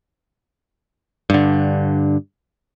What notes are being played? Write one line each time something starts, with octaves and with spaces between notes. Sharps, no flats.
G2 D3